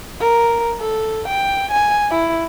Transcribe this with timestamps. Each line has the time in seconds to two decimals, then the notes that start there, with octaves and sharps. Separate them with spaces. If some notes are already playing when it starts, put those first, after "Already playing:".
0.19 A#4
0.80 A4
1.27 G5
1.71 G#5
2.11 E4